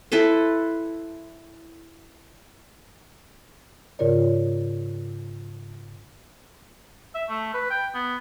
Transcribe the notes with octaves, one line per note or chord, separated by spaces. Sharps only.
E4 A4 B4 C5
G#2 C#3 F4 A#4 C#5 D5
E5
A3
B4
G5
B3